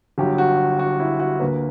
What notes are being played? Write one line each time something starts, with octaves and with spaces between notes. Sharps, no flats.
G1 G2 F#3 G4
F#4
F#4
E4
F#4
D2 D3 A#3 B4